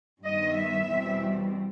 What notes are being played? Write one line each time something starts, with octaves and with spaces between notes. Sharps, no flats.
G2 D#3 G3 B3 D#5
E5
E2 B2 G3 C4